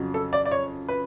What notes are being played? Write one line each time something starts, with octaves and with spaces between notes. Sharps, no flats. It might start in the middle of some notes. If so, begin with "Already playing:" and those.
Already playing: F2 C#3 F#3
A4
D5
D5
C#5
B4